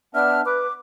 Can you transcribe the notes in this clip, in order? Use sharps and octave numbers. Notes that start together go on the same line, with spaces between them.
B3 D4 E5 F6
B4 D6